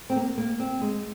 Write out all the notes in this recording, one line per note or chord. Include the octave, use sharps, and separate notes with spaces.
C4
A#3
A#3
C4
G#3